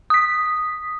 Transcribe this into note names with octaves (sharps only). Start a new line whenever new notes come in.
D#6 B6